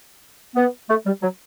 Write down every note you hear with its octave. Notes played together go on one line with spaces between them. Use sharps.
B3
A3
G3
F#3